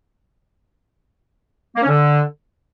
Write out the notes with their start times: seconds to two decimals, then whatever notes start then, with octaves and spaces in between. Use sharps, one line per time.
1.76 A#3
1.82 C#4
1.88 D3